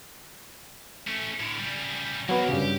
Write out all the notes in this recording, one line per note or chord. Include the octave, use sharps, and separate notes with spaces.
A3 C#4
A2 D3
C#3 G3
E3 F#3 A#3 B3
G2 C#3 G4